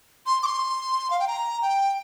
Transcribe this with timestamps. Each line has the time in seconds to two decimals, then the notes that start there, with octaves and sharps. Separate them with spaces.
0.26 C6
0.43 D6
0.46 C6
1.10 F5
1.20 G5
1.28 A#5
1.62 G5